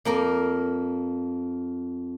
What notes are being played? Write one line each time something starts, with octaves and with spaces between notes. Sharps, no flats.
F2 A#3 A#4 D5